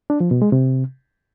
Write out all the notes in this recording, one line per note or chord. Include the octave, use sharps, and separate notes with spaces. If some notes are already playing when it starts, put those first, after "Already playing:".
D4
F3
B2
G#3
C3